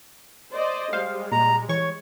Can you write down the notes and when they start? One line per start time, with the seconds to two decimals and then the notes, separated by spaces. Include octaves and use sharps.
0.53 C5 D5 D#5
0.93 G3 G#3 C5 F5
1.32 A#2 A#5
1.69 E3 C#5 C#6